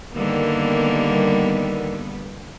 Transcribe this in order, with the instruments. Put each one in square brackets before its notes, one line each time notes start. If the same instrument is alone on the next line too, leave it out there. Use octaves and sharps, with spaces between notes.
[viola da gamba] D3 A#3 [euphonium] D#3 [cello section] G3 B3